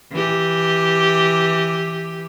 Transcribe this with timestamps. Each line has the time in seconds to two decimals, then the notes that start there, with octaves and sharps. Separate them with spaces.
0.13 E3 G4